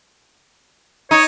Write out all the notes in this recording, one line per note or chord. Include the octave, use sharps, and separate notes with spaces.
D#4 C#5